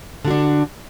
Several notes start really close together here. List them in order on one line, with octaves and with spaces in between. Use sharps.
D3 F#4 D4